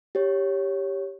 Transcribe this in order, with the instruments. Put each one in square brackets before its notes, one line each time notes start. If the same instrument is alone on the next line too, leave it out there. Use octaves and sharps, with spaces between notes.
[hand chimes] G4 C#5